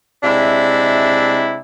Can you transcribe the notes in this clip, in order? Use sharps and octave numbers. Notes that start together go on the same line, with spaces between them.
C3 G#3 D4 E4